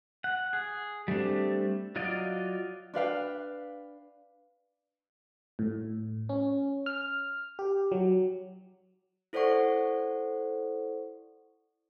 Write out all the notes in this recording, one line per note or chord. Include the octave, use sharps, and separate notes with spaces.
F#5
G#4
G3 A3 C4 D4
F#3 F4 D5 D#5
D4 B4 F5 G5
A2
C#4
F6
G4
F#3
E4 A4 C5 D5 F#5 C#6